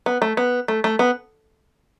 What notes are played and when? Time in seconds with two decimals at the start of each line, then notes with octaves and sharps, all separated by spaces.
0.06 B3
0.22 A3
0.37 B3
0.68 A3
0.84 A3
0.99 B3